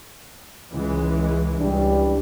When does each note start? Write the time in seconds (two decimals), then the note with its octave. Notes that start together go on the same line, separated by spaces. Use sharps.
0.72 C#2 E3 G#3
1.58 C#2 E3 G3 D4